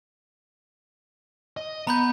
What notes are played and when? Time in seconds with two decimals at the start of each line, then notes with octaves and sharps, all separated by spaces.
1.57 D#5
1.87 B3 A#5 B5 G6